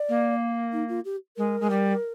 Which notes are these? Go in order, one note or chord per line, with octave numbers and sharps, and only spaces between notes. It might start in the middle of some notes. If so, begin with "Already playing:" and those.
Already playing: D5
A#3
D#4
F4
G4
G#3 A#4
G#3
G3